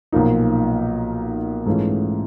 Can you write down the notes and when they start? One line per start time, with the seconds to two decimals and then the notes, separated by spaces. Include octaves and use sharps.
0.12 B1 A#2 F3 A#3 D#4
1.66 G#2 E3 A3 C#4 F4